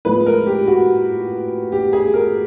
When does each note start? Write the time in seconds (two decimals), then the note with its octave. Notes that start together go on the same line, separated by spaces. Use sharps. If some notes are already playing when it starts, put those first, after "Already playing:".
0.05 A2 F3 G#3 B4
0.26 A#4
0.47 G4
0.67 F#4
1.72 G4
1.93 G#4
2.14 A#4